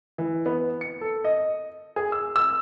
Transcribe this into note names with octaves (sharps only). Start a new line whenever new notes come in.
E3
B3
C#7
A4
D#5
G#4
E6
E6